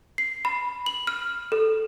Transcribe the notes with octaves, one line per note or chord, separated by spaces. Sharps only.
C7
B5
F#7
F6
A4